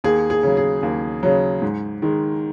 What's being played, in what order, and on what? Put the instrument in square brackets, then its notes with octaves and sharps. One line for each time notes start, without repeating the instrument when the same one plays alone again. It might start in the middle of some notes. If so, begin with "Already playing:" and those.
[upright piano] D#2 G#4
G#4
C#3 F#3
G#4
D#2
C#3 F#3
G#2
D#3 G#3